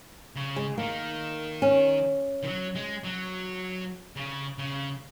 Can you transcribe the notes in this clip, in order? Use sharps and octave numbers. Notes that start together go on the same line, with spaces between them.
C#3
G#3
D#3 A#3
C#4
D#3
F#3
G#3
F#3
C#3
C#3